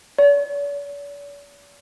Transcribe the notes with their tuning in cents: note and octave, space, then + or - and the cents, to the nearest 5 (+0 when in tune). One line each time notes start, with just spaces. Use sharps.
D5 -45